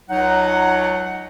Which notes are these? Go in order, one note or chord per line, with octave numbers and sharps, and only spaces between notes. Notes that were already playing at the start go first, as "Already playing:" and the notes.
C#2 F#3 D#4 F#5